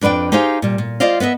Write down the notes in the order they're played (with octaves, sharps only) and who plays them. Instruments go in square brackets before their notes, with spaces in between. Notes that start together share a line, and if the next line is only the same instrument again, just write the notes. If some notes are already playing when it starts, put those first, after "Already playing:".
[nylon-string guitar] F2 D4 B4 D5 G5
D#4 G4 G#4 C5 F5
A#2 G3
A#2
F4 C5 D5 D#5 F5
B3 B4 D#5 E5